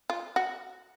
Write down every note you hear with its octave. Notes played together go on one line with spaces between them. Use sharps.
F4
F#4